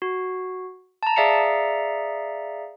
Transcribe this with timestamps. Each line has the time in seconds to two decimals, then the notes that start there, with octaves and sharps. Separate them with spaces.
0.02 F#4
1.03 A5 A#5
1.16 G#4 D5 E5 F5 A#5 C#7